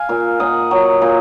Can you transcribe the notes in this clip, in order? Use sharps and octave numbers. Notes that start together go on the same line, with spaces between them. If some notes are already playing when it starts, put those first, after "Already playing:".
Already playing: F5 G#5
A#2
A#2 D#5 F#5
F#3
A#2